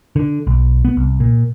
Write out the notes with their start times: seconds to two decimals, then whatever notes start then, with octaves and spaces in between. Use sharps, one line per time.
0.16 D3
0.47 B1
0.85 B3
0.97 C2
1.20 A#2